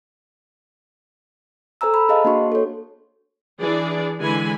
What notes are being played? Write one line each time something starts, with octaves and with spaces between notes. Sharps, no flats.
A4 C5 G#5 A#5 E6
B5
G#4 C5 D#5 F5 A5
A#3 D4 F#4 C6 C#6
A4 C#5
E3 D4 G#4 D5
D3 E3 G#3 G#5 B5